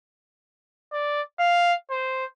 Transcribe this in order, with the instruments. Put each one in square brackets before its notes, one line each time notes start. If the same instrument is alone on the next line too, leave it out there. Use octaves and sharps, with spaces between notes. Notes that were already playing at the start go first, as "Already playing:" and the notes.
[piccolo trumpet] D5
F5
C5